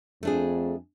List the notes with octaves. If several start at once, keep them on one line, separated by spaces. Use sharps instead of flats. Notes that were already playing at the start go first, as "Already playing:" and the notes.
F2 A3 D4 G#4